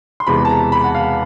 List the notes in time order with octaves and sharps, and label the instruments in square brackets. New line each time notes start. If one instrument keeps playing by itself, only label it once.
[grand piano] C6
E1 E2 C3 E3 B5
A5
A#5
B5
F#5
F5